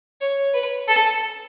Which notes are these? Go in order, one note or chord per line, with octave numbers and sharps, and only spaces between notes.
C#5
B4
A4